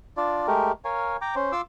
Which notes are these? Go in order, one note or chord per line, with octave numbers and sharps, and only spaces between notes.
D4 F4 D5
G#3 A3 G4 A#4
A#4 C#5 F5 G#5
G5 A#5 D6
C#4 C5
F4 C6 D6 E6